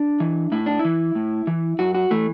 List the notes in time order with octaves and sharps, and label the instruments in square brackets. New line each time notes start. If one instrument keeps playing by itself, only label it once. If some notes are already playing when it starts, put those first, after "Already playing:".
Already playing: [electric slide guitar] D4
E3
A2 E4
D4
E4
E3
A2
E3
F#2 F#4
F#4
E3 A3